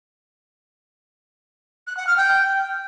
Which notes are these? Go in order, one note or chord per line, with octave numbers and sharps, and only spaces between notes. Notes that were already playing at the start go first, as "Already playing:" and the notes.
F#6
F#5
F6
G5